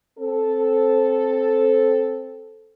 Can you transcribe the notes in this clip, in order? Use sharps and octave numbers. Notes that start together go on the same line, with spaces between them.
C4 A4